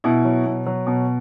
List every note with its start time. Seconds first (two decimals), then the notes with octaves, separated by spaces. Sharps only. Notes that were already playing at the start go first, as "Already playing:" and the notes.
0.04 B2 E4
0.25 F#3
0.46 B2
0.66 F#3
0.87 B2